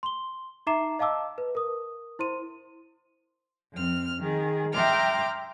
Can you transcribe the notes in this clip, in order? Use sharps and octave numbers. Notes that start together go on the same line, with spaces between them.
C6 G7
D#4 E5 A#5 D6 C7 E7
D#5 F5 A5 D6 E6
B4
A#4 D#6
E4 C5 C6 D#7
F2 C4 F6
D#3 G#4
E5 G5 A#5 C6 D6 F6